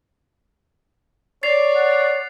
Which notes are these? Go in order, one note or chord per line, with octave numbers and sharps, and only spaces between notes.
C#5 D5 A6 C7 F7
F#5